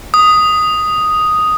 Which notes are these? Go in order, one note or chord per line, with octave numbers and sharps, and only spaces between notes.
D#6